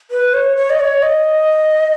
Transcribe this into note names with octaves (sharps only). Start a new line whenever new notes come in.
B4
C#5
C#5
D#5
C#5
D#5